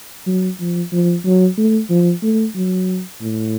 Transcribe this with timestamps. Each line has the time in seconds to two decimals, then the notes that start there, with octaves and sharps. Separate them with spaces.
0.27 F#3
0.60 F3
0.93 F3
1.25 F#3
1.58 A3
1.90 F3
2.23 A3
2.55 F#3
3.21 A2